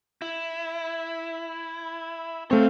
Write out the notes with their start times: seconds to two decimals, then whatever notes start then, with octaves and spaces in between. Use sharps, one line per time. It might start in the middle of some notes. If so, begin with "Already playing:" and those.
0.22 E4
2.51 A3 C4 C#5 F5